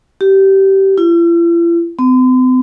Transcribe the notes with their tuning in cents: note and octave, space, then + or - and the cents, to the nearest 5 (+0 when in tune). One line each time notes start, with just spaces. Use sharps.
G4 -20
E4 +45
C4 -45